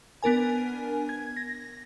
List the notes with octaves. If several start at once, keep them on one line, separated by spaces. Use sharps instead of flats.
B3 D4 A#4 G#5
G#6
A#6